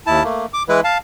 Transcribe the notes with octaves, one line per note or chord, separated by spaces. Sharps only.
D#2 E4 A5
A3 A#3
D6
E3 G#3 E4 B4
F5 A5